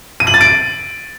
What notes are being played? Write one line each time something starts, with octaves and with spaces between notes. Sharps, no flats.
D#7
F#7
A6
D7